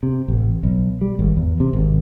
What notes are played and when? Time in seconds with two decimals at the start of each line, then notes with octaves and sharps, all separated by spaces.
0.03 C3
0.28 A1
0.63 B1
1.01 G3
1.19 G#1
1.37 E2
1.60 C3
1.73 G#1